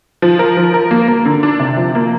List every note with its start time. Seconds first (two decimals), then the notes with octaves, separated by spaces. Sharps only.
0.22 F3
0.39 A#4
0.57 F3
0.74 A#4
0.91 A#3
1.08 A#3
1.25 D3
1.43 D4
1.60 C3
1.77 F3
1.95 A#3